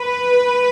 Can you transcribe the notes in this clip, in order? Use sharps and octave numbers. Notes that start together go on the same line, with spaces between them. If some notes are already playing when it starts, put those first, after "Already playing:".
Already playing: B4